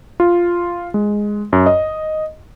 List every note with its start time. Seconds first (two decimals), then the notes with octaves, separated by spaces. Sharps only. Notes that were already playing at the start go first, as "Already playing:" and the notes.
0.20 F4
0.94 G#3
1.53 F#2
1.66 D#5